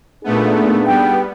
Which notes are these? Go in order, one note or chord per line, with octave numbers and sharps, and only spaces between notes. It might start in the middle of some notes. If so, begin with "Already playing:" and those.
A#2 A3 B3 D4 D#4 G#4
G3 B3 G5